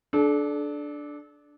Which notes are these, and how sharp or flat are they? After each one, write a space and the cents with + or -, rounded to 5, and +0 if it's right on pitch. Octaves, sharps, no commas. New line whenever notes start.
D4 +0 A4 -35